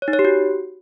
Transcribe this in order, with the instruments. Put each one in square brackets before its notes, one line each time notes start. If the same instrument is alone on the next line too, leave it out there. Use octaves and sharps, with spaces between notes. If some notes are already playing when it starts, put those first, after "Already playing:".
[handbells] C#5
D#4
C#5
G4
F#4